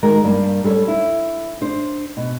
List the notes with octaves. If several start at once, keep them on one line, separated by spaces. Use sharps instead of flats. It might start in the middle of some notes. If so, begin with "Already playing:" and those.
D#3 G#3 F#4 A#4
G2 A#3
G3 A4 B4 C#5
E4
D4 C5
B2